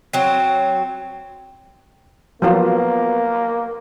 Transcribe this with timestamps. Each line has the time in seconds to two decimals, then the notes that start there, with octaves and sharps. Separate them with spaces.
0.13 F#3 C4
2.42 F3 F#3 A#3 B3 F4